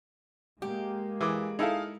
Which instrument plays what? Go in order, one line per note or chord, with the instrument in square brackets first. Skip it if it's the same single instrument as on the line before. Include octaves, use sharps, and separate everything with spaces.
[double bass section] G#3 A#3 [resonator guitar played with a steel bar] G4
[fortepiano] E3 [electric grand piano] G#4 D6
[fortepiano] D#4 E4 A4 [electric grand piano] G#4 F5